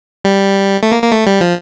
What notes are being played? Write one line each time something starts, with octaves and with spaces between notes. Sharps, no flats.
G3
A3
A#3
A#3
A3
G3
F3